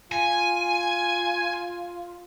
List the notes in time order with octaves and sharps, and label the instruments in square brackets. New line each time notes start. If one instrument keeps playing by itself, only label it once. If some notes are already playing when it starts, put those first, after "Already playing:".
[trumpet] F4 [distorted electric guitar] G#5